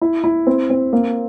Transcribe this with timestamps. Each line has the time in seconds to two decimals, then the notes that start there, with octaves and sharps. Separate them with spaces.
0.01 E4
0.24 E4
0.47 C4
0.70 C4
0.93 A#3